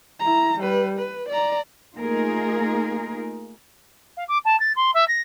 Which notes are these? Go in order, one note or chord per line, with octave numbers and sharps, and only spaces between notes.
E4 A#5
G3 B4
B4
D5 A#5
A3 A#3 D#4 F4 G#4 A#4
F5
D6
A5
A6
C6
E5
A#6